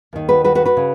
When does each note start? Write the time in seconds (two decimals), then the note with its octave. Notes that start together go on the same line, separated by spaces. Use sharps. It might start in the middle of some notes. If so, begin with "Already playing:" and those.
0.13 D#2 D#3
0.29 F#4 B4
0.44 F#4 B4
0.55 F#4 B4
0.65 F#4 B4
0.77 C#3